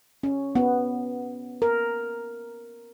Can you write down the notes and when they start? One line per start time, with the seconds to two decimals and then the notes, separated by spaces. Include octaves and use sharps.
0.23 C#4
0.55 B3
1.62 A#4